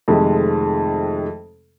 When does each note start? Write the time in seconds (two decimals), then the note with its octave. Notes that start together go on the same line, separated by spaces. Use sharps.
0.08 F2 C3 D#3 F3 G#3 A3